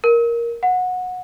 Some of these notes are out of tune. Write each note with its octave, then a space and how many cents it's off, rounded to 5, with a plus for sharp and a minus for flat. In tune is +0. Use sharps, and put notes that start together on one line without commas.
A#4 +5
F#5 -20